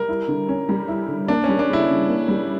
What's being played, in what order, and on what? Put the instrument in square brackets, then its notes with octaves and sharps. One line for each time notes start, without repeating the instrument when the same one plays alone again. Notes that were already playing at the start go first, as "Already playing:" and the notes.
Already playing: [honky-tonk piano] G3 [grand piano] A#4
[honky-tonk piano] E4
D3
C#4
G3
E4
D3
[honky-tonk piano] A#3 [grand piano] D4
[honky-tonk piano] G3 [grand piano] C#4
[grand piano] D4
[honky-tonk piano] C#3 [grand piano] E4
[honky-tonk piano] C#3
A#3
G3